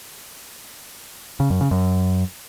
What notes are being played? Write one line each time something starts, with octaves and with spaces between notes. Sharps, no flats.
C#3
F#2
C#3
F#2